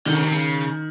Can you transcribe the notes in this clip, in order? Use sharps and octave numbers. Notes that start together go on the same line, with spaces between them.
D3 D#3
C#3
C3
C#3